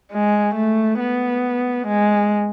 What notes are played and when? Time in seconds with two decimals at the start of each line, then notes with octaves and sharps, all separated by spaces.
0.12 G#3
0.55 A3
1.00 B3
1.87 G#3